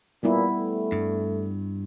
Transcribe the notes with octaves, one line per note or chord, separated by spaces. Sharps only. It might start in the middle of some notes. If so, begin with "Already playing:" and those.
A#2 G3 B3 E4
A3
G2